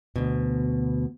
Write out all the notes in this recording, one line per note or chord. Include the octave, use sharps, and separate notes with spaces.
D2 B2